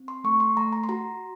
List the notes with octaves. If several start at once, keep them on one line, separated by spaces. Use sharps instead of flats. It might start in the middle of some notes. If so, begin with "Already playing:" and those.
Already playing: C4
C6
A3 C#6
C6
A3 A#5
A#5
C6
F#4 A#5